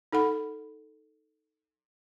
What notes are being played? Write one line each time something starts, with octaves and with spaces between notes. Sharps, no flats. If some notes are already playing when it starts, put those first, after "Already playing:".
D#4 A4 F#5 B5